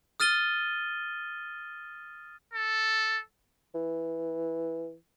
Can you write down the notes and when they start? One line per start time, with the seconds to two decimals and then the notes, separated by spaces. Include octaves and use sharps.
0.20 D#6 F6 A6 D#7 G7
2.54 A4
3.75 E3